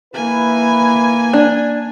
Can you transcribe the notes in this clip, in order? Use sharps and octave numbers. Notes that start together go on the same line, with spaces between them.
A#3 E4 B4 G#5
D4